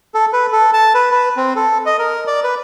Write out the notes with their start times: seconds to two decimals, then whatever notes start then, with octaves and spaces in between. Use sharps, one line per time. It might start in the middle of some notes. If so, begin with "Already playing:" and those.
0.14 A4
0.33 B4
0.52 A4
0.73 A5
0.94 B4
1.11 B4
1.37 C4
1.56 A4
1.86 D#5
1.99 A#4
2.27 D5
2.44 B4